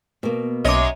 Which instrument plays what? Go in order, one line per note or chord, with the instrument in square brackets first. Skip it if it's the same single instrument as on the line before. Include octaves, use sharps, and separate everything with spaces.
[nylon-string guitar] B2 A#3
[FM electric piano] B1 D6 [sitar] F#2 C#5 D#5